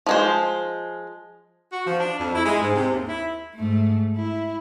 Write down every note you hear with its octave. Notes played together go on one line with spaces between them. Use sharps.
F3 G#3 C5
F#4
F3
D4
F2
E4
G#3
G#2
C3
D#2
E4
G#2 A3
E4